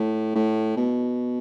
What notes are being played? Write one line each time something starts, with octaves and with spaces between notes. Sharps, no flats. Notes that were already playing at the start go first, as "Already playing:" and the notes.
Already playing: A2
A2
B2